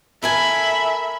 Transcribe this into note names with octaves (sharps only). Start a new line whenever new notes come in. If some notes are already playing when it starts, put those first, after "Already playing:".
A4 A#4 E5 G#5 B5